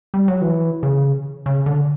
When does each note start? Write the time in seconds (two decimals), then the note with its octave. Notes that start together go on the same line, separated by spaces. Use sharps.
0.14 G3
0.28 F#3
0.41 E3
0.83 C#3
1.46 C#3
1.66 D3